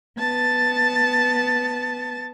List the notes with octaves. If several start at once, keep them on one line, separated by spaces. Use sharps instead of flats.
B3 A5 A6